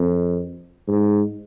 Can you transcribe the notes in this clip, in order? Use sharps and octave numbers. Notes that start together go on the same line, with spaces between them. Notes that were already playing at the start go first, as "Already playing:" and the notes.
Already playing: F2
G#2